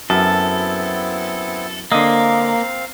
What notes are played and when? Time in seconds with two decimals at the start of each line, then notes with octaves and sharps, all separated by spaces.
0.10 F#2 B3 C4 E4 A4
1.92 D3 A#3 C4 D#5 F5